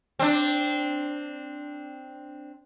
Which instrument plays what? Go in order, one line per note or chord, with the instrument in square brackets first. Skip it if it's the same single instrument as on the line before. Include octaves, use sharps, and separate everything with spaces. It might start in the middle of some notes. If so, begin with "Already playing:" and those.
[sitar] C4 D4